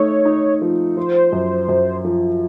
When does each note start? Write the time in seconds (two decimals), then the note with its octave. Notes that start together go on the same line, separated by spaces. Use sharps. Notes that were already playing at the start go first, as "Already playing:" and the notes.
Already playing: A3 D#4 C#5
0.25 D#4
0.62 F3
0.97 F3 C5
1.32 F#2
1.68 F#2
2.05 F3